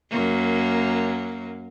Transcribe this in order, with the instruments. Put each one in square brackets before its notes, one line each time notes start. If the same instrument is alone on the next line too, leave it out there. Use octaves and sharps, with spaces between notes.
[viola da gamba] F#2 A#3